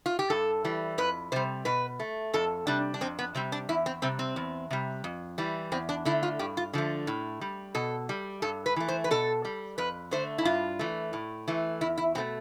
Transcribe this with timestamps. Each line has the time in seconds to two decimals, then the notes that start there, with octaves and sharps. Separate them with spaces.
0.06 F4
0.19 G4
0.30 G2 A4
0.65 E3 G3
0.98 F2 B4
1.32 C3 G3 C5
1.65 B2 B4
2.00 A3
2.34 F2 A4
2.67 C3 G3 D4
2.94 D4
3.01 F2 C4
3.19 B3
3.35 C3 G3 C4
3.52 D4
3.69 E2 E4
3.86 C4
4.02 C3 G3 C4
4.19 C4
4.36 E2
4.71 C3 G3
5.04 F2
5.38 E3 G3
5.72 E2 C4
5.89 D4
6.05 D3 A3 E4
6.23 F4
6.39 G2 G4
6.57 F4
6.73 D3 F3 A3
7.07 A2
7.41 G3
7.75 B2 A4
8.09 G3
8.42 G2 A4
8.66 B4
8.76 E3 A3
8.88 C5
9.04 B4
9.11 B2 A4
9.45 G3
9.78 F2 B4
10.11 D3 A3 C5
10.38 E4
10.45 G2 F4
10.79 E3 A3
11.13 A2
11.48 E3 A3
11.81 E2 E4
11.98 E4
12.15 B2 A3 C4